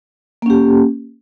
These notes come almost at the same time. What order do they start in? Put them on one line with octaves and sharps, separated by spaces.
A#3 C#4 G4